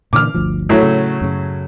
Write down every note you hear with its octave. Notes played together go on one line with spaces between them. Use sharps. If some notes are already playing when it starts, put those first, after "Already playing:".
A#2 D3 E3 D6 F6
G1 D2 F3
A2 F#3 A3
C#3
F#2 C#3